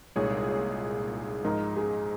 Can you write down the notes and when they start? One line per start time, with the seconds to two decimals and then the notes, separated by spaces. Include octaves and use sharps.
0.16 C2 A#2 G#3 D#4 G#4 C#5
0.48 C#5
1.44 G#2 F3 G#3 D#4 A#4
1.76 G#4